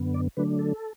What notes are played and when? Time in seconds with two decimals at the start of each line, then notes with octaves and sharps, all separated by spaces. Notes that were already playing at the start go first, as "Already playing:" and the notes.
Already playing: F#2 D3 B3
0.14 D5
0.37 D3 F#3 A3 D4 B4
0.59 A4